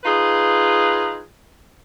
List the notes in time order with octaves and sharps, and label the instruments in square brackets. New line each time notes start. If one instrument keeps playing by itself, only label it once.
[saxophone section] D#4 F4 G#4 B4